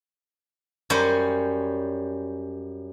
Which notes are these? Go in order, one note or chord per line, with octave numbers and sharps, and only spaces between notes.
F#2 G3 C#4 C5